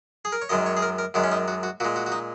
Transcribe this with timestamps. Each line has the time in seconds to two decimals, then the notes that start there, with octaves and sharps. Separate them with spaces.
0.25 G#4
0.32 A#4
0.42 C#5
0.49 F#2 D#3 G#3 D#5
0.66 C#5
0.77 G#4
0.82 A#4
0.98 A#4
1.14 F#2 D#3 G#3 F#4
1.24 C#4
1.32 D#4
1.48 F#4
1.63 F#4
1.80 A#2 G#3 F#4
1.96 F#4
2.06 F#4
2.12 D#4